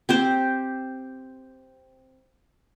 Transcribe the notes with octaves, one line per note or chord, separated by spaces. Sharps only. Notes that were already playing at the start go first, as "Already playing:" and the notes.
C4 G4 C5